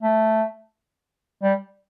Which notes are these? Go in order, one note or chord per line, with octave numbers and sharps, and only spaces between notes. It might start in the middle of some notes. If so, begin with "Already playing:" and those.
A3
G3